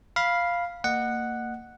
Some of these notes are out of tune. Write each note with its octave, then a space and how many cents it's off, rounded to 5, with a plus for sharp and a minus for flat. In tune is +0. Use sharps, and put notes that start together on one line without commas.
F5 +0 B5 -10
A#3 -25 D#5 -30 F#5 +0